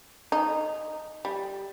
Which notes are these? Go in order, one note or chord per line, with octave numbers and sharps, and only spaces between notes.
D#4
G3